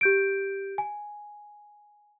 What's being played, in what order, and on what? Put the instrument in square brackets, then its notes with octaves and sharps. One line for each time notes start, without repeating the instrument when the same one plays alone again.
[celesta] G4 G6 D7
G#5